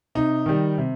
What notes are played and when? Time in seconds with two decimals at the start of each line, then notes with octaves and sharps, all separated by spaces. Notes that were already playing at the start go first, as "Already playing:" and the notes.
0.15 C3 D#4
0.46 D#3 G3
0.78 C3